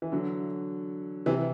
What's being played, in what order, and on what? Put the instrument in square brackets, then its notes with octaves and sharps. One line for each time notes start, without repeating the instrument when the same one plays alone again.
[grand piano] E3
D3 F#3
C3 E3